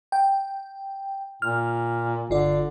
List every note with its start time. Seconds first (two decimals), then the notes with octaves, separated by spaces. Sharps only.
0.12 G5
1.42 A#2 F6
2.30 G1 D3 F4 D5